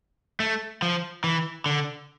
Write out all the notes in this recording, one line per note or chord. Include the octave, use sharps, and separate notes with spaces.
A3
F3
E3
D3